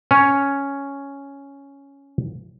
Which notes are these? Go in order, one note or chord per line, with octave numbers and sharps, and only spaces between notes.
C#4 C#5